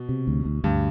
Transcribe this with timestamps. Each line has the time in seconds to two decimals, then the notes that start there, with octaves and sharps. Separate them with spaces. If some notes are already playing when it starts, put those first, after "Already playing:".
Already playing: B2
0.09 C3
0.27 D2
0.45 D2
0.64 D2 G2